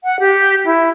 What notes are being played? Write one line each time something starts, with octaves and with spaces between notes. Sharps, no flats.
F#5
G4
E4